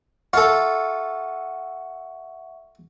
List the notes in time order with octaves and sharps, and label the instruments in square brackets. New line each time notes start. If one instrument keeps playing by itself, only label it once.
[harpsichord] F4 A4 [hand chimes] E5 C#6 [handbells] F#5